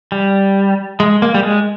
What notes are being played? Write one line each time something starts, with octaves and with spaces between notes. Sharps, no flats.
G3
G#3
A#3
G3
G#3